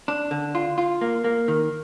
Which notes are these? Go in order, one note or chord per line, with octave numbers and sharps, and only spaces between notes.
D4
D3
F4
F4
A#3
A#3
D#3